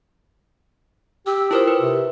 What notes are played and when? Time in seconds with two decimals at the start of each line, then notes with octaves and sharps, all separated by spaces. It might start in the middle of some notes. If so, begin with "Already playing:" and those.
1.27 G4 E6
1.51 E4 F4 A#4 C5
1.68 B4
1.80 C3